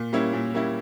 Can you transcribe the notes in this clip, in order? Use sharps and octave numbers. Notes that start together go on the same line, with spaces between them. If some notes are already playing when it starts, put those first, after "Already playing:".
Already playing: A#2
G3 A#3 C#4 E4
A#2
G3 A#3 C#4 E4